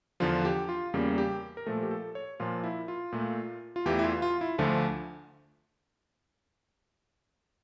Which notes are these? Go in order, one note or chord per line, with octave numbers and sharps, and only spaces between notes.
E2 D3 F3 F4
G4
F4
E2 C#3 G3 A#3
G4
A#4
A#2 F3 A3 A4
G4
A4
C#5
A#2 F3 A#3 F4
E4
F4
A#2 A3
F4
E2 E3 A3 G4
E4
F4
F4
E4
D2 D3 F3 A3 F4